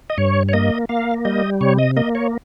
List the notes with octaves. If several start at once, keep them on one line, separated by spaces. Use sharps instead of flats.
D#5
G2 C#5
C#5
A#3 D#5
A#3 F5
G3 D#5
C3 C#5
D#5
A#3 D#5
C#5